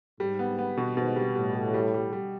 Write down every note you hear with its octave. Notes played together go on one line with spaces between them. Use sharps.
G#2 G3
B3
B3
B2
G#2 B2
G3
A2 G3
G3
G3
G3
G3